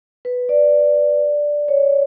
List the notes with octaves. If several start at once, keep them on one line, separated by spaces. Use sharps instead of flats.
B4
D5
C#5